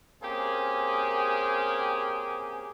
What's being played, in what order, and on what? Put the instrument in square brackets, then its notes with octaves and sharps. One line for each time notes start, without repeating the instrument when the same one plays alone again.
[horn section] A#3 C4 C#4 G4 G#4